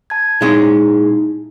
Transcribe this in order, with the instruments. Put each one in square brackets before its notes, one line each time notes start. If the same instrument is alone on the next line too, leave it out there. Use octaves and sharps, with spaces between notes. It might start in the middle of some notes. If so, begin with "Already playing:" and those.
[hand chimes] A5 G#6
[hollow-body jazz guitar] A#2 G#3 C#4 [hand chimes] D#4 E4